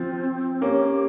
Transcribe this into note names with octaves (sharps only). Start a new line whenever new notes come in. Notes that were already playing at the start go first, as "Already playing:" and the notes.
Already playing: F3 C4
A#3 C#4 G4